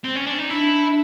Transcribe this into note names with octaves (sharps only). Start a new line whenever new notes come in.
C4
C#4
D4
D#4
D4 E4